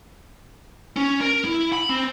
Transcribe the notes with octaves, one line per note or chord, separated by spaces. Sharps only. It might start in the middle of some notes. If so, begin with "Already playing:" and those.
C#4
A#4
E4
B5
C4